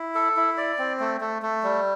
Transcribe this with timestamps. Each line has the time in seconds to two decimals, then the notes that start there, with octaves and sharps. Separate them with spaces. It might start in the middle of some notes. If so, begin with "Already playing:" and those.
Already playing: E4
0.15 A4
0.37 E4
0.57 D5
0.79 C4
1.00 A3
1.21 A3
1.42 A3
1.63 G3